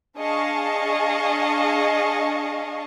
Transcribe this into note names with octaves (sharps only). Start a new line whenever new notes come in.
D4 G#4 D#5 F5 A5 C#6